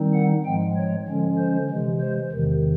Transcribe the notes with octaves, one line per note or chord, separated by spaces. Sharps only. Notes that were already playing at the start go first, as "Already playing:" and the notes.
Already playing: D#3 G3 C4 D#4
F#5
G#2 F3 G#3 G5
C#5
D3 F3 G#3 C#4
C5
C3 E3 G#3
C5
E2 C3 D#3